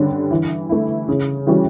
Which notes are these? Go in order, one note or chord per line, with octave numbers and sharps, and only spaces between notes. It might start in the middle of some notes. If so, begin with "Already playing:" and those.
Already playing: G2 D3 G3 C#4
E3
A3 E4
C#3
E3 G3 C#4 F#4